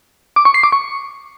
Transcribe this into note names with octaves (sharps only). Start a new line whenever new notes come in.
D6
C#6
C7
D6
C#6